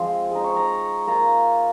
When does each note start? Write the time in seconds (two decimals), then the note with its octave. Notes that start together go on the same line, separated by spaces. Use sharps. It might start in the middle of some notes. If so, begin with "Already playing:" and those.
Already playing: F3 G#3 C4 C6
0.31 G#3 D#4 D#6
0.44 C#6
0.56 A#5
1.07 A#3 F4 A#5